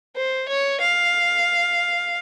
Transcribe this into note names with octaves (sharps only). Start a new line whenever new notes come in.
C5
C#5
F5